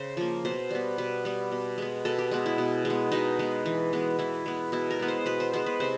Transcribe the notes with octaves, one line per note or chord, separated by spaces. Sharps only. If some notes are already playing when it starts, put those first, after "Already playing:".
Already playing: C#3 C5
F3 A#3
B2 C5
G3 B3
B2 B4
G3 B3
B2
G#3 B3
B2 A4
G4
G#3 B3
E4
B2
G#3
B3
B2 D#4
G#3 B3
E3
G#3 B3
E3 E4
G#3 B3
B2 E4
A#4
G#3 B3
C5
B2 B4
C5
G#3 B3 C5
B4
C3 C5